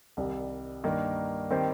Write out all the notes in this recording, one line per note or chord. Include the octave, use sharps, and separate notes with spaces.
C2 C3 D#3 G3
G2 D#3 A#3
D#3 G3 C4 G4 C5